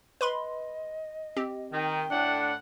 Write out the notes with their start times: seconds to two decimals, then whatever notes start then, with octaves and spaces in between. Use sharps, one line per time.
0.21 B4 D#5 B5 C6
1.36 C4 G4
1.72 D#3 G5
2.11 A2 D4 F#5